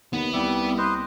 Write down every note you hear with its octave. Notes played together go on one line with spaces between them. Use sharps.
D#2 B3
C2 G3 E5 D6
B4 C5 D#5